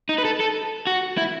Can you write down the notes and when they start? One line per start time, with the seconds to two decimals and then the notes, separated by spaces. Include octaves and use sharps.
0.09 D#4
0.18 B4
0.25 A4
0.40 A4
0.87 F#4
1.17 E4